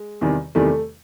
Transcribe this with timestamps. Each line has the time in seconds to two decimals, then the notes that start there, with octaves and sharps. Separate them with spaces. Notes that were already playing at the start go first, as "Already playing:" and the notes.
Already playing: G#3
0.21 E2 C3 D#3 G3
0.55 E2 C3 D#3 G3 A3